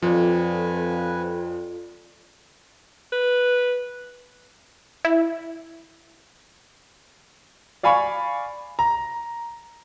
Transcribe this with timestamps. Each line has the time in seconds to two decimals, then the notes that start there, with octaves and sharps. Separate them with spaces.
0.02 F2 F3 F4 A4 B4 D5 G#5
3.12 B4
5.05 E4
7.83 D5 F5 G#5 B5 C#6
8.79 A#5